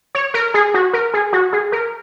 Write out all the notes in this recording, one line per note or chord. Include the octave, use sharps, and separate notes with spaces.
C#5
A#4
G#4
F#4
A#4
G#4
F#4
G#4
A#4